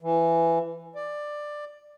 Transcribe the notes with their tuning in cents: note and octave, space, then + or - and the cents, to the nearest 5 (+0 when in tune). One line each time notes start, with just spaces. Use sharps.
E3 +15
D5 +15